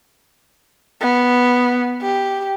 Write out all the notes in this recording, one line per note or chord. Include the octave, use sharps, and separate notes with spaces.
B3
G4